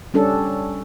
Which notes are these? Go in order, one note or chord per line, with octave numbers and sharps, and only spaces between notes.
G3 C#4 D4 A4